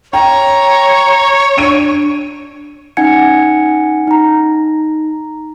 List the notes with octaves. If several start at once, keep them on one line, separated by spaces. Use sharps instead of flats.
C#5 G5 A#5
D4 D7 D#7
C#4 D#4 F#5 G#5 G#6 C#7
D#4 A#5